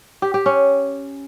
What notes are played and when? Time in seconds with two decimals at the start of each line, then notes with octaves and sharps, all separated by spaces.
0.22 G4
0.34 G4
0.46 C#4